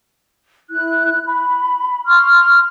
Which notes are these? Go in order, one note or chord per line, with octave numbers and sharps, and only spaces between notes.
E4 F#6
B5
C6 C#6 F6